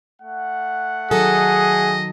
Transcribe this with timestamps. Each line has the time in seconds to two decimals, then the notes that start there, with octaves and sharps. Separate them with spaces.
0.22 A3 F#5
1.11 D#3 F#3 G#4 A4 D#5